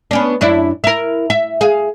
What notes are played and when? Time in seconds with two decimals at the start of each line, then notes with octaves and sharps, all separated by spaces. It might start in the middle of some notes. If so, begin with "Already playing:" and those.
0.11 B3 C#4 D4
0.41 F#2 D4 E4
0.84 E4 A#4
1.30 E5
1.61 G#4 F5